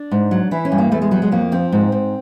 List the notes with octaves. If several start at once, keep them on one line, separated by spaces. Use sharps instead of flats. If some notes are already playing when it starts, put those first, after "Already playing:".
Already playing: D4
G#2
F#3
E3 E4
C#4
G2
A#3
E2 A3
G#3
F#3 G3
G#3
F2 A#3
F3 C4
G#2
G#2